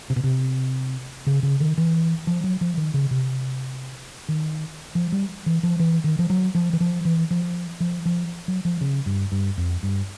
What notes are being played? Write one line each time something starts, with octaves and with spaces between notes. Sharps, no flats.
C3
B2
C3
C#3
C#3
D#3
E3
F3
F#3
F3
D#3
C#3
C3
D#3
F3
G3
E3
F3
E3
D#3
F3
F#3
F3
E3
F3
E3
F3
F3
F3
F#3
F3
C#3
G2
G2
F2
G2